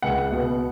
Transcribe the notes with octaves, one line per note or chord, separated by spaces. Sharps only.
C#2 F#5
B2